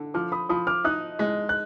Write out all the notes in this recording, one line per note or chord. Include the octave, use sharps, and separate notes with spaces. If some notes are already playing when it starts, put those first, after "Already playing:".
Already playing: D3
F3 D6 F6
B5 D#6
F3 B5 D#6
D6 F6
D#4 D#6 F#6
G#3
F#6